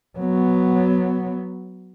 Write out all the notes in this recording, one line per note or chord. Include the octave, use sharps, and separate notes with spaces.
F#3 B3